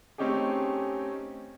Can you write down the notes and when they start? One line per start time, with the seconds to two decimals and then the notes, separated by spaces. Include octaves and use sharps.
0.18 A3 C4 C#4 D#4 G4 G#4